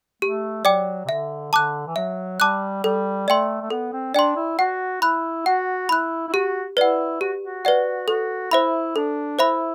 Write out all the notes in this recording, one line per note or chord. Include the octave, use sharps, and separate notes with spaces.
A3 G4
F#3 D5 G5 D6
C3
D3 E5
D3 A5 D6 F#6
E3
F#3 E5
G3 A5 D6 F#6
G3 A4
A3 D5 G5 C6
A3
B3 A4
C4
D4 D5 G5 C6
E4
F#4 F#5
E4 B5 F#6
F#4 F#5
E4 B5 F#6
E4
F#4 G4
E4 B4 D5 F#5
F#4 G4
F#4
B4 D5 F#5
F#4 A4
E4 C5 E5 B5
D4 A4
E4 C5 E5 B5